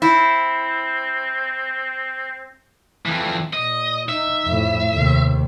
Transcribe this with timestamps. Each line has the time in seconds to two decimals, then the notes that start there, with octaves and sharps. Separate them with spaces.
0.02 C4 E4
3.06 F2 E3
3.53 A#2 D#5
4.09 D#4 E5
4.44 F2 A2
4.92 D#2 C3